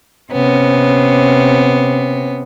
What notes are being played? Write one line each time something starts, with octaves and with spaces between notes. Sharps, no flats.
C3 B3 C#4